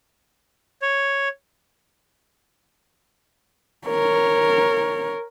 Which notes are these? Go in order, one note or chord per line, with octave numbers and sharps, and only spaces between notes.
C#5
A#4 C#5